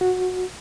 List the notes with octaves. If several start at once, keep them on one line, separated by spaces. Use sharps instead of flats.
F#4